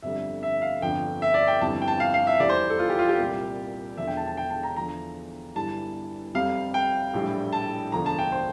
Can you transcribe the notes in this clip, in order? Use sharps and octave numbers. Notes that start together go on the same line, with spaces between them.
G1 F2 D3 G3 E5
E5
F5
G1 F2 D3 F3 G5
E5
D5
G5
G1 F2 E3 G3 A5
G5
A5
F5
F5
E5
F1 E2 C3 E3 G3 D5
C5
A4
F4
G4
F4
G4
C2 A#2 G3
E1 E2 D3 F3 E5
G5
A5
A5
G5
A5
A#5
E2 D3 F3 A#5
G1 G2 E3 G3 A5
F1 F2 C3 G3 F5
G5
A#1 A2 E3 G3
A5
E1 D2 D3 F3 A#5
A5
G5
C5